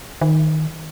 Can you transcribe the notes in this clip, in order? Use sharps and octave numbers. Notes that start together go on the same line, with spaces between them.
D#3